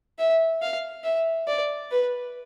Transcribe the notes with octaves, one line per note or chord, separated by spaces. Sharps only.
E5
F5
E5
D5
B4